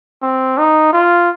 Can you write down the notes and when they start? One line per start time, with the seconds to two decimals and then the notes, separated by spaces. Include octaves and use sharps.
0.22 C4
0.58 D#4
0.93 F4